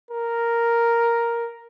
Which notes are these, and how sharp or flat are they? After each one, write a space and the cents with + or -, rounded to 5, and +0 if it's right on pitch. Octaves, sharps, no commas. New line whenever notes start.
A#4 +0